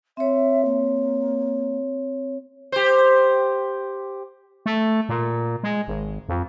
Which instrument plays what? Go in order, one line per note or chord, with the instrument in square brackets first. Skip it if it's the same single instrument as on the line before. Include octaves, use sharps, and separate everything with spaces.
[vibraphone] C4 C#5 [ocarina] E5
[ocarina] A#3
[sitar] G4 C5
[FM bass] A3
A#2
G#3
G#1
F2